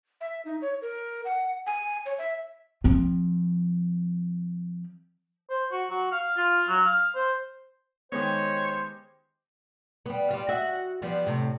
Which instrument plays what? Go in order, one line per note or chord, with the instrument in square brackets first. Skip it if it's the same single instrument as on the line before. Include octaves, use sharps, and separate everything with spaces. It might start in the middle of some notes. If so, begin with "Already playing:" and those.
[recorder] E5
D#4
C#5
A#4
F#5
G#5
C#5
E5
[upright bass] F3 C4
[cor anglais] C5
F#4
F#4
F5
F4
F#3
F5
C5
[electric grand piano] D#3 G#3 B3 [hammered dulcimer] G4 D#5 [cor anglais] C5 [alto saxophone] C#5
[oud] G3 B3
G3 F4
F#4 D#5 E5
F3 G3 B3
A2 C3